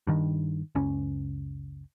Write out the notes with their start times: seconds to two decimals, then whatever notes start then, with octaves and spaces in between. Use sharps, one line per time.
0.07 G2 D#3
0.75 F#1 C#2 C#4